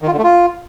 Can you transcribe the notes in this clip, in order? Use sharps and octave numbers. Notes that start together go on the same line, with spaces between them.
D#3
F4
D3
A3
F4